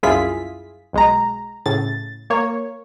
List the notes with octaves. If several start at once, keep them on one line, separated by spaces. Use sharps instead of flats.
C2 F#2 E4 F4 G#4 B6
B1 G#3 A#5
A2 C#3 A6
A#3 C#5